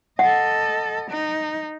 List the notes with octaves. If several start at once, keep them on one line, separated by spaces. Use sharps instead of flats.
A4 D#5 F#5
D#4